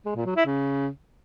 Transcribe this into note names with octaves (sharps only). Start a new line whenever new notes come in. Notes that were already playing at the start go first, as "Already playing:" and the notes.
G#3
A#2
F#3
E4
C#3